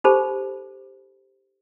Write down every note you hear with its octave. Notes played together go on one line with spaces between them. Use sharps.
D#4 G4 A4 C5 B5